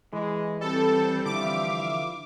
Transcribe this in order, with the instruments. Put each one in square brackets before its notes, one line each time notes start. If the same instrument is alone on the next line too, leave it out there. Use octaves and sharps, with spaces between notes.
[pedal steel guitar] E3 [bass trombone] G#3
[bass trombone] G3 [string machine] C4 G6 [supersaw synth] A4
[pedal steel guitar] D3 E3 F3 [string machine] E5 F5 [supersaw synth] D6